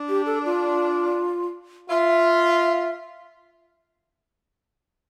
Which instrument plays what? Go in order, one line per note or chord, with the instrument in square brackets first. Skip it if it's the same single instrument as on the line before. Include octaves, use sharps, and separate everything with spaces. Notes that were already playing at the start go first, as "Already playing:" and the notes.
Already playing: [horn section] D4
[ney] G4
A4
F4
[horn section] F4 [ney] E5